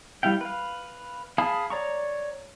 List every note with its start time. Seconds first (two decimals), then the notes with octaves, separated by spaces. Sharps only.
0.23 G3 E4 F5 G5
0.41 B4 F5
1.38 G#4 F5 A5 B5 D#6
1.70 C#5 D5 A#5 C#6